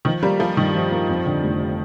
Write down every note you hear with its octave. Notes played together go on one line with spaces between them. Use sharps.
D#3 F3
G3 A#3
F3 F4
G2 D#3
F3
A#3
F2
D3
F1